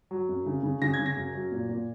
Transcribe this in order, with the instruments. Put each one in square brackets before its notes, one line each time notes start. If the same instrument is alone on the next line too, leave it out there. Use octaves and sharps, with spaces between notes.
[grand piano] F#3
F#2
C#3
C#3
C#3 A#6
G#6
C#3
A#6
F#2
F#3
A#2
A#2